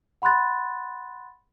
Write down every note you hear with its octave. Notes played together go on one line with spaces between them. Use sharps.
F#5 B5 C6 F#6 A6